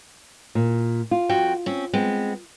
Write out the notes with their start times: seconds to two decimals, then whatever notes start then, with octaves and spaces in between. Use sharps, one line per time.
0.55 A#2
1.11 F4
1.29 F2 F#4 G5
1.66 C4 C#4
1.93 G#3 B3 C4